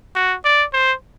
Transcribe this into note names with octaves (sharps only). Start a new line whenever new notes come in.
F#4
D5
C5